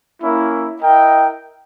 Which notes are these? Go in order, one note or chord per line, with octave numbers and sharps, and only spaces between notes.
A#3 C#4 E4
E4 A#4 D#5 G5